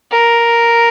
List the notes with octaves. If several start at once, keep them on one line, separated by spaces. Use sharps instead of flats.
A#4